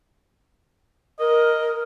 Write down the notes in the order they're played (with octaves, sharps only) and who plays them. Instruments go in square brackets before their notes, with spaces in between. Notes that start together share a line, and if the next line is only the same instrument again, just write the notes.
[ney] A#4 [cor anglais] D#5